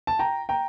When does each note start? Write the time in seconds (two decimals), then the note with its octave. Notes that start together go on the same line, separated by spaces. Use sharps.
0.07 A5
0.19 G5 A#5
0.49 G5 A#5